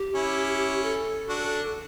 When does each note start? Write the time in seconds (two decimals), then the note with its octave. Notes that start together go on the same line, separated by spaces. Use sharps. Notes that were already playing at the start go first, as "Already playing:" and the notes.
Already playing: G4
0.15 C#4 E4
0.83 A4
1.29 D4 F#4